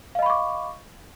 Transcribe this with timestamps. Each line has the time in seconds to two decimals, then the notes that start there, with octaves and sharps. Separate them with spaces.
0.15 F5
0.19 D#5
0.22 B5
0.26 C#6
0.30 D6